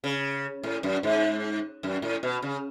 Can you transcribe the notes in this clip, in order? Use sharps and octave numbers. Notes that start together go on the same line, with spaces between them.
C#3
A2
F#2
G#2
F#2
A2
B2
C#3